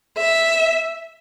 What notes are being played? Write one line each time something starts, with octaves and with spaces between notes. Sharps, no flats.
E5